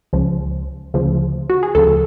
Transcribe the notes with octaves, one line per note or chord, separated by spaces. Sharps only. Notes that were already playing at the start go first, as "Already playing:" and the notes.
C#2 C#3 F3
D2 C#3 F3
F#4
G#4
D2 C#3 F3 A4